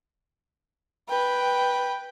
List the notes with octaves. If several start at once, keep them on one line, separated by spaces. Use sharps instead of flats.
B4 G5